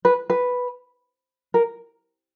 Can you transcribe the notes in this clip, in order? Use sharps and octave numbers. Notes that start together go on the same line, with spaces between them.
B4
B4
A#4